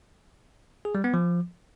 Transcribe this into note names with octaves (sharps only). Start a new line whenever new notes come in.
G#4
G3
B3
F3